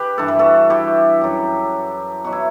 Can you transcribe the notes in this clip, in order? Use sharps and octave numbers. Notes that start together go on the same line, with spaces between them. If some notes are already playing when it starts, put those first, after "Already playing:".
Already playing: G4 B4
G2 E3 A4
B4
F#4 A4
E4 G4
F#2 F#3
B2 F#3 F#4
E4